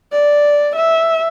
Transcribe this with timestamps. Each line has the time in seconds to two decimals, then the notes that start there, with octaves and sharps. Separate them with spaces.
0.12 D5
0.76 E5